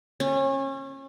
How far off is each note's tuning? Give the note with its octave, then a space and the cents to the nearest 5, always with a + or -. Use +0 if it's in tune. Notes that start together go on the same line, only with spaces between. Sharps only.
C#4 -30